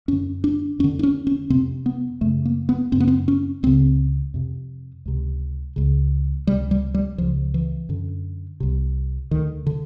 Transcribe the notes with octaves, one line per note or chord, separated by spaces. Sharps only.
F#2 D3 C#4
D4
F2 D3 C#4
D4
C#4
C#4
F2 C3 C4
B3
F#2 C#3 A3
A#3
B3
F#2 C#3 C4
B3
C4
C#4
C#2 C#3 C4
F2 C3
C#2 C3
C#2 C#3
C#2 C3 G3
G3
G3
C#2 C#3 F3
E3
F#2 D3
C2 C3
D2 D3 D#3
D3